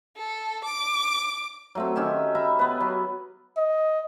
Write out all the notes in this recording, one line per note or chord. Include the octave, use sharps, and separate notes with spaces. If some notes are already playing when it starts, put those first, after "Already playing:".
A4
D6
F#3 A3 C4
D#3 C#4 G4 E5
E5 A#5 B5
B3 B4
F#3
D#5